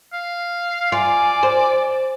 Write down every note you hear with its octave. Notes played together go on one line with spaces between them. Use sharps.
F5
F4 D5 G#5
C5